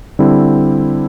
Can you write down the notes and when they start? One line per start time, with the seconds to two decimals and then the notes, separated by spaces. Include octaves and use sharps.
0.19 D3 G3 C4 E4